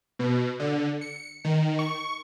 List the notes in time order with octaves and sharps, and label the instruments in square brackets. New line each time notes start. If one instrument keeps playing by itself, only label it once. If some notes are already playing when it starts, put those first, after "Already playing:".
[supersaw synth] B2
D3
C#7
D#3
C#6